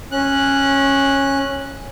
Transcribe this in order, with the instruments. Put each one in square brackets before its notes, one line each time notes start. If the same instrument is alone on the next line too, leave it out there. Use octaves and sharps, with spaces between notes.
[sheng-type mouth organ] C#4 F#6